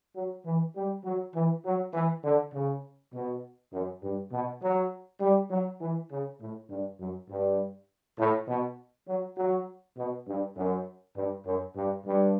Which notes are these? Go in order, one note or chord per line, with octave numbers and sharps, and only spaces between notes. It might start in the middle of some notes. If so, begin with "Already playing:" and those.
F#3
E3
G3
F#3
E3
F#3
E3
D3
C#3
B2
F#2
G2
B2
F#3
G3
F#3
E3
C#3
A2
G2
F#2
G2
A2
B2
F#3
F#3
B2
G2
F#2
G2
F#2
G2
G2